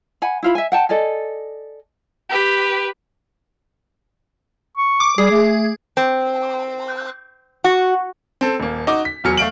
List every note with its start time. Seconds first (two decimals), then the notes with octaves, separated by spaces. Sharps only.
0.22 F#5 G#5 B5
0.43 E4 F4 B5
0.55 E5 G#5
0.72 F#5 G5 A5
0.89 A4 D5 D#5 G#5
2.30 G4 B4
4.77 C#6
5.00 D6
5.18 G3 G#4
5.31 A3
5.97 C4
7.64 F#4
8.41 C4 A4
8.60 D#1 A#3
8.87 D#4 F#4 D6
9.05 B6
9.24 E1 E2 F#3 F6 C#7
9.37 A3 F5 D7 F#7